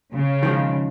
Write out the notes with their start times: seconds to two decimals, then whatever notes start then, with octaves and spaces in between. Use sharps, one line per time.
0.13 C#3
0.43 D#3 F3 G#3